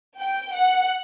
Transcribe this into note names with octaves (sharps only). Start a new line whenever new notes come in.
G5
F#5